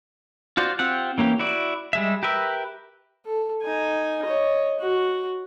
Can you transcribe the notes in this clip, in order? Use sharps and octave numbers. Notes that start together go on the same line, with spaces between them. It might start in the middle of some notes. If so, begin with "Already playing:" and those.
F4 F#4 C5 D5
C4 F4 G4 F#5
E3 A#3 C#4 G4
E4 F#4 D5
G3 G#3 E5
G4 A#4 B4 E5
A4
D#4 G#5
C#5 D#5
F#4